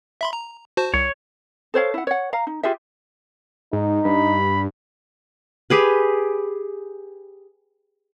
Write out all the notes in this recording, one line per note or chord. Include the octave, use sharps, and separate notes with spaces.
E5 B5 C6
A#5
F#4 C5 A5
C2 C#5
A4 C5 C#5 F5
E4 F#5
C#5 F#5
F5 A#5
D#4
F4 G4 G#4 E5
G#2 D#4
G2 B5
G4 G#4 B4